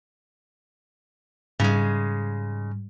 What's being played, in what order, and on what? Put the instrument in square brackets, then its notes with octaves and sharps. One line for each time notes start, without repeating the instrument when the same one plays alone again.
[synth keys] G#2 G3 [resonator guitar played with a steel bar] C#3 G#3